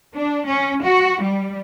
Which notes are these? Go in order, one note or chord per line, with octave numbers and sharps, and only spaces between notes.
D4
C#4
F#4
G3